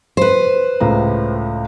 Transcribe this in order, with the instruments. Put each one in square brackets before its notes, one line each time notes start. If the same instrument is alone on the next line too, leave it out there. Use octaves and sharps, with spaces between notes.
[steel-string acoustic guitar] B4 C5
[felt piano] C#2 A2 A#5